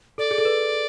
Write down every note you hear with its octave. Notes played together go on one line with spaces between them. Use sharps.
A4 D5
G#4
A4
B4